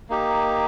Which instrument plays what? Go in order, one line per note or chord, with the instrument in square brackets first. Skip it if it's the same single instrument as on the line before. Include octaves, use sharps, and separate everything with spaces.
[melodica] A#3 D#4 G4